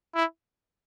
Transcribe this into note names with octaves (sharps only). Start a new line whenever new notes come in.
E4